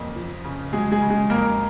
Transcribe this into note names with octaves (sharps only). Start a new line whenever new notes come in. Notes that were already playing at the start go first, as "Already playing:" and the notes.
Already playing: F2 C#3 A#3
F3
C#3
F#3 G#3 G#4
G#3 G#4
C#3
G#3 G#4
F2 A#3 A#4